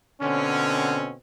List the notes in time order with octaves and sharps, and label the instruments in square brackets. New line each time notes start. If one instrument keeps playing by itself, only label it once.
[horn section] B2 D3 C4 C#4